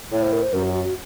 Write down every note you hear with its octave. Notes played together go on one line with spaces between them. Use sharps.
A2 C#5
C5
A#4
C5
F#2 A#4
F#4
F#4
F#4